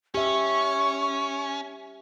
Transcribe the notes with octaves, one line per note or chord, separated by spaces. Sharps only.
C#4 G4 E5 C#6